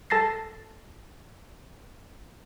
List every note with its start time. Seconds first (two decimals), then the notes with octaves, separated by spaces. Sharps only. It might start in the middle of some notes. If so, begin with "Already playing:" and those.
0.10 A4 A5 A6 A#6 C7